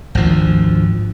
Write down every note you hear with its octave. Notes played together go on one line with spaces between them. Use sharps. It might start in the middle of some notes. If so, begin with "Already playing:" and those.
G#1 D2 F3